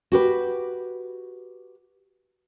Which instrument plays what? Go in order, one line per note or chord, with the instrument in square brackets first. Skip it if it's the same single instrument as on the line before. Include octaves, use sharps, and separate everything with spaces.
[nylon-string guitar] F#4 G4 B4